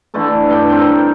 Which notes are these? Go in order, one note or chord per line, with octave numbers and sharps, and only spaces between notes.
D3 E3 A3 A4
G2 D5 F#5 G5
C4 A#4